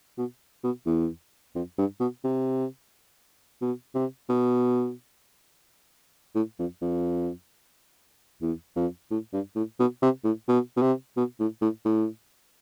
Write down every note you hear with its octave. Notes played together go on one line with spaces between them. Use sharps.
B2
B2
E2
F2
G2
B2
C3
B2
C3
B2
A2
F2
F2
E2
F2
A2
G2
A2
B2
C3
A2
B2
B2
C3
B2
A2
A2
A2